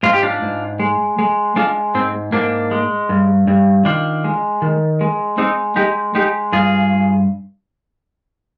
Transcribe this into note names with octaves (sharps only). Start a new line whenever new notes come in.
G#2 F4
G4
D4 F4
G#2
G#3
G#3
G#3 D4 F4
G#2 C4
G#2 A#3 D4
G#3
G2
G2
D#3 D4 F4
G#3
D#3
G#3
G#3 C4 D#4
G#3 D#4 G4
G#3 D#4 G4
G2 F4 G#4